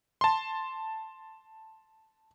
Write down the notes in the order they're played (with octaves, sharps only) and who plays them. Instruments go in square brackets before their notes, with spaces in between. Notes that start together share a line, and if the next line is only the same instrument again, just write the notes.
[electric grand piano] A5 C6